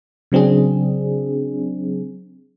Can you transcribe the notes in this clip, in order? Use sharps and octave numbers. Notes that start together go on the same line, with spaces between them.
C#3 F#3 C4 D4 G#4